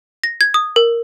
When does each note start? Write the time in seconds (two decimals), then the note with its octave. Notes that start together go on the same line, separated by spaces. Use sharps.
0.24 A#6
0.41 G#6
0.54 D#6
0.76 A#4